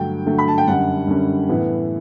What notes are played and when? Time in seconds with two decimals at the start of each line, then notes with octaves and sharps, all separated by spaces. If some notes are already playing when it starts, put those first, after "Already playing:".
Already playing: G2 D3 F#3 A3 G5
0.26 G2 D3 F#3 A3
0.38 B5
0.48 A5
0.58 G5
0.67 F#2 D3 G3 C#4 F#5
1.07 F#2 D3 G3 C#4
1.49 A2 E3 B3